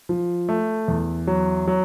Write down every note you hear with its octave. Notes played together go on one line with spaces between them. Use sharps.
F3
A3
E2
F#3
F#3